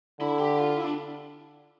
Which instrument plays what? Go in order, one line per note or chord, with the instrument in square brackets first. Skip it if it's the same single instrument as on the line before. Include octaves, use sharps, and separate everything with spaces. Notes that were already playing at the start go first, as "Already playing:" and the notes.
[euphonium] D3 [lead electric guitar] E4
[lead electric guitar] G4
F4
E4
D4